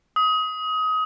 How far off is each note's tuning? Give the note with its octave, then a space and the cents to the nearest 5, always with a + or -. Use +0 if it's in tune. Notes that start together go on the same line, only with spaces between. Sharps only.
D#6 +25